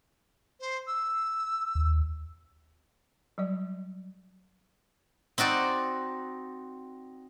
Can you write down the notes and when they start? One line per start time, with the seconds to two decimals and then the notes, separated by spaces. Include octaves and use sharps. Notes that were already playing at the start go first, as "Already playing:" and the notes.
0.60 C5
0.87 E6
1.75 D#2
3.38 F#3 G3 D5
5.38 C4 D#4 F#4 D5